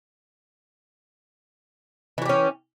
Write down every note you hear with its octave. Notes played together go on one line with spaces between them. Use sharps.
E3 C#4 F#4 G4